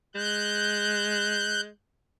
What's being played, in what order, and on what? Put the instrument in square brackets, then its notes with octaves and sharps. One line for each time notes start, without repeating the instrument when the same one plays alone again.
[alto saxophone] G#3 [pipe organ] F#6 G6